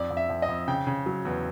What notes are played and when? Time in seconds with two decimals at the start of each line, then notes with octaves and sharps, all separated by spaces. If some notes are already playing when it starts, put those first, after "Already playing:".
Already playing: F2 D5
0.10 F2
0.17 E5
0.30 F2
0.42 D#5
0.49 F2
0.68 C#3 G5
0.87 C#3
1.06 F#3
1.25 E2